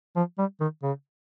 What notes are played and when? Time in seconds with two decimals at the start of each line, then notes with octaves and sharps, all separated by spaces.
0.16 F3
0.38 G3
0.60 D#3
0.83 C#3